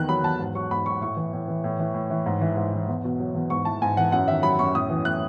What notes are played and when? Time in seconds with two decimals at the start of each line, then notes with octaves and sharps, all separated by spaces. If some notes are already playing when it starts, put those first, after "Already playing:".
Already playing: E2 D#3 F#6
0.09 F#3 B5
0.23 E2 A5
0.39 G#2
0.55 F#3 C#6
0.71 G#2 B5
0.86 F#3 C#6
1.01 A2 C#6
1.17 E3
1.33 A2
1.48 E3
1.64 A2
1.79 E3
1.94 A2
2.10 E3
2.26 G#2
2.41 E3
2.57 G#2
2.73 E3
2.88 E2
3.04 B2
3.20 F#3
3.35 E2
3.50 G#2 C#6
3.65 E3 A5
3.82 G#2 G#5
3.97 E3 F#5
4.12 F#2 F#5
4.28 D#3 E5
4.43 F#3 B5
4.59 F#2 C#6
4.74 A2 D#6
4.90 E3
5.05 A2 F#6